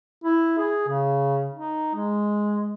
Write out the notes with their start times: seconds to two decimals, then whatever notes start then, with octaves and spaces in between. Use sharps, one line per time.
0.24 E4
0.58 G#4
0.88 C#3
1.53 D#4
1.95 G#3